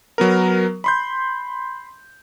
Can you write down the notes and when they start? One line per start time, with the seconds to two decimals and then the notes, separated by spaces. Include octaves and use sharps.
0.18 F#3 B3 A#4
0.84 B5 C6 G6